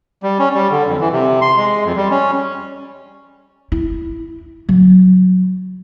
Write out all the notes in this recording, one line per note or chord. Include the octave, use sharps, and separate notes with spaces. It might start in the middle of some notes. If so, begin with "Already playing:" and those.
G3
C#4
G3
D3
F2
E3
C3
C6
G#3
F2
G3
C#4
E4
F#3